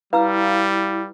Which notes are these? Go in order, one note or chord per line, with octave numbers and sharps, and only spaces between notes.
G3 E4 B4 F5 A#5 E6